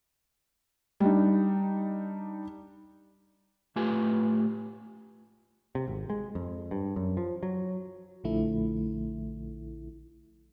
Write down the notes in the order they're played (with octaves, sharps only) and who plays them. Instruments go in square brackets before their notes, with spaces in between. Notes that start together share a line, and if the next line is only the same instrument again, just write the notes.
[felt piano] G3 D4 D#4
[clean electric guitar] A2 A3 F4 G4 B4 G#5
[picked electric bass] C3
G#1
G#3
F2
G2
F#2
F3
F#3
[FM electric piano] A#1 D3 F3 A3 E4